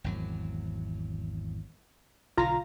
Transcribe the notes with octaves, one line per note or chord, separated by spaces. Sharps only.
G#1 E2 F#3
B1 D3 F4 A#5